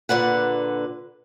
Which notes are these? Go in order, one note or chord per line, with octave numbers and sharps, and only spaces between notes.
A#2 D3 B4 F#5